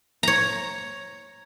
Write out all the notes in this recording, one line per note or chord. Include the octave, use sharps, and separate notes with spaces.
C#5 A#5